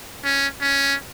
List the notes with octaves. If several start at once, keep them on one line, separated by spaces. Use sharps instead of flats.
C#4
C#4